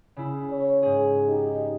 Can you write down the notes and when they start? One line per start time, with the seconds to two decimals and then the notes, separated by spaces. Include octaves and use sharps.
0.16 C#3 E4
0.50 C#5
0.83 G#2 G#4
1.28 D#4 G4